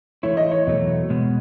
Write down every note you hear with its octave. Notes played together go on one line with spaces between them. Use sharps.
E3 A3 E4 C#5
D#5
C#5
E2 B2 F#3 A3
B2 G#3 B3